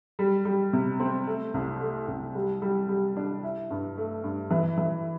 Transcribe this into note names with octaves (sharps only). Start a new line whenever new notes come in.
G3
G3
C3
C4
A3
C2
A3
C2
G3
G3
G3
D4
E4
G2
A3
G2
E3
E3